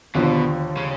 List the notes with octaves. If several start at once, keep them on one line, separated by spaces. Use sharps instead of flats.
D#2 B2 D3 F3
C#3